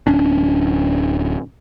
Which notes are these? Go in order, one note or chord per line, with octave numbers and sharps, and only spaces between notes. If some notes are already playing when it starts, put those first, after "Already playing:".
D1 C#4 D4